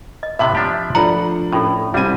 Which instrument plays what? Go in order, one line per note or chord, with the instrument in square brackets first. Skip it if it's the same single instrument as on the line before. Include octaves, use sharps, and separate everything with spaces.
[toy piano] D#5
[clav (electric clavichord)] A2 C3 B3 [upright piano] E5 F#7
[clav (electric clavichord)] F3 D4 G4
[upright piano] F3 A3 D4 [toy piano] F4 A#5 [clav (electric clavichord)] F#5
[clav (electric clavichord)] A2 [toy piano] C#4 F4 A4
[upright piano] C2 C4 D#7 [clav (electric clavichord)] G3 G#5